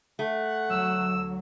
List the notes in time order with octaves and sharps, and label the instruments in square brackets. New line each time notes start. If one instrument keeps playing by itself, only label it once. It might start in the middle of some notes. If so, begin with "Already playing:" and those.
[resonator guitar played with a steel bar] A3 [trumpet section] F#5
[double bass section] D2 F#3 [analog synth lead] E6